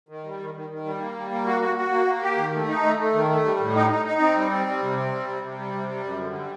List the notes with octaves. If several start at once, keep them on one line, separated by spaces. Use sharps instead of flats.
D#3
G3
D#3
D#3
D#3
G3
A#3
G3
A#3
F#4
F#4
F#4
A#3
A#3
G4
D#3
A3
D#4
A3
A3
D#3
A3
G3
A2
D#4
D#4
D#4
C4
G3
C4
G3
C3
C4
G3
C3
C3
G3
C3
G3
F#2
D3
G3